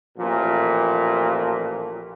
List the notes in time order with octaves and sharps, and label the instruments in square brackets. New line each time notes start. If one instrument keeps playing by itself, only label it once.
[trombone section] A1 A#2 F3